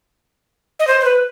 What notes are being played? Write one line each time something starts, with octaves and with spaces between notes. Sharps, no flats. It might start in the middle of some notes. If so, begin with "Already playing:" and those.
D#5
C5
C5
B4